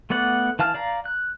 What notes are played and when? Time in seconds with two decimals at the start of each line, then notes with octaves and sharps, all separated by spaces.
0.10 A3 B3 D5 F#5
0.59 E3 F5 A5 F6
0.75 D5 F5 A#5
1.05 F#6